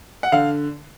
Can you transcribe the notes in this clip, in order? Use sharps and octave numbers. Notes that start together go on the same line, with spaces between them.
F#5
D3 F5